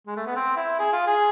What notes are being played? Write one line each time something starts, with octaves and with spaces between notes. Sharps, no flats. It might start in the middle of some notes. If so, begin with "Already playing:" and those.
G#3
A3
B3
C4
E4
G#4
F4
G#4